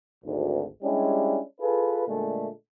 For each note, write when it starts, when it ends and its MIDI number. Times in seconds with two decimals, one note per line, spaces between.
0.25 0.63 32
0.25 0.63 38
0.83 1.38 55
0.83 1.38 56
0.83 1.38 61
0.83 1.38 62
0.83 1.38 64
0.83 1.38 67
1.61 2.03 65
1.61 2.03 68
1.61 2.03 69
1.61 2.03 71
2.07 2.48 46
2.07 2.48 50
2.07 2.48 56
2.07 2.48 57